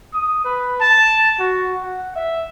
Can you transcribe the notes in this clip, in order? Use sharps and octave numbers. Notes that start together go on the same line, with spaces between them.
D#6
B4
A5
F#4
F#5
E5